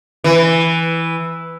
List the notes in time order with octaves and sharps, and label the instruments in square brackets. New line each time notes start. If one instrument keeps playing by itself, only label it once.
[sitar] E3